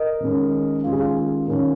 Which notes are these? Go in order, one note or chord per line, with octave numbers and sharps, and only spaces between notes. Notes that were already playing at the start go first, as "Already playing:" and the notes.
Already playing: A#4 D#5
D#3 G#3 C#4
D#3 G#3 C#4 F4
G#4
F4
D#3 C#4